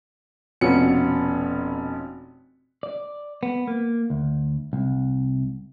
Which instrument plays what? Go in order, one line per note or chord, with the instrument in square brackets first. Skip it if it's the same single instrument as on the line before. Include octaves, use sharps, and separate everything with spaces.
[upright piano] F1 B2 C#4 F4 F#5 C#7
[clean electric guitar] D5
B3
A#3
D2
C2